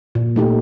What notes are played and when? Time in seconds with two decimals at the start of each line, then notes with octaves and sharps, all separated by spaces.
0.15 A#2
0.36 A3 D#4 G4